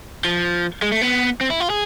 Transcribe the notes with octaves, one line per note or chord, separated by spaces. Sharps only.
F3
G#3
A3
B3
C4
E4
F4
G#4